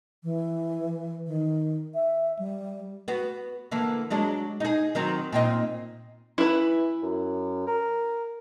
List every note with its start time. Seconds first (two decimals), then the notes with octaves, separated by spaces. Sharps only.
0.23 E3
1.27 D#3
1.94 E5
2.39 G3
3.08 B3 F#4
3.71 D3 E3 A#3
4.10 F#3 G#3 D4
4.60 D#4 G#4
4.95 D#3 F#3 C4
5.33 A#2 C4 D#4
6.38 E3 E4 B4
7.03 F#2
7.67 A#4